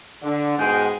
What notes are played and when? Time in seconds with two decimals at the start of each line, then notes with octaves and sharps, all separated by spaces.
0.23 D3
0.58 G#2 B2 G#3 F#5 G5